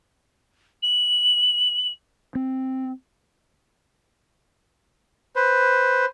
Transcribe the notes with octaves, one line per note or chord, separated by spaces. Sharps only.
F#7
C4
B4 C5